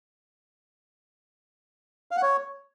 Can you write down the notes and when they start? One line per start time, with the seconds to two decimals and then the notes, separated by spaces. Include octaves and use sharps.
2.11 F5
2.17 F#5
2.22 C#5